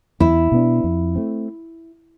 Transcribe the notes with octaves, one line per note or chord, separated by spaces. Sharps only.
E2 E4
B2 B3 D4
F2
A3 C4